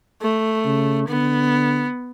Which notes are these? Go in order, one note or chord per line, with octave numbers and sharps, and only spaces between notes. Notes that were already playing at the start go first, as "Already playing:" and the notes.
A3
C#3
D3 B3